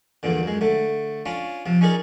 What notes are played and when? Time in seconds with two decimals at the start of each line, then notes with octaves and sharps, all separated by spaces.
0.23 E2 G2 A#2 D3
0.43 F#2 G#3
0.61 D3 A3
1.26 C#4 D4 F4
1.66 C3 F3
1.81 C#4 D#4 G#4 A#4 D5